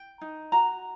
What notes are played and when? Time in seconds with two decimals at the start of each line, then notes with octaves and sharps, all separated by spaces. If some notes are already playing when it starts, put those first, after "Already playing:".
Already playing: G5
0.21 D#4
0.52 F#4 A#5